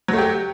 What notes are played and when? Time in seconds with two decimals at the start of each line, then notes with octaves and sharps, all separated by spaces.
0.08 F#3
0.13 A3
0.18 G4